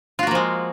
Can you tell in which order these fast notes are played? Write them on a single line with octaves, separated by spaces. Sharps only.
F4 F#4 A#3 F3 G#3